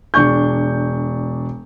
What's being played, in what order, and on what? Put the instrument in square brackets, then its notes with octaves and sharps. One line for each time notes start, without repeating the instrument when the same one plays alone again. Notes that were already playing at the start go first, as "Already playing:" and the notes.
[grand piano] E1 D4 C#6 G6